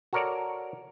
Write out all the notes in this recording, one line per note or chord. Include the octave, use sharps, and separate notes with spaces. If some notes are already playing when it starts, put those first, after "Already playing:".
F#4 A4 A#4 C#5 D5